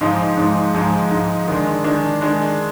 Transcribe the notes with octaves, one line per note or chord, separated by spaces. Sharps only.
G#2 F3 G#3 D#4
G#2 F3 G#3 D#4
G#2 F3 G#3 D#4
G#2 F3 G#3 D#4
D#3 G#3 D4
D#3 G#3 D4
D#3 G#3 D4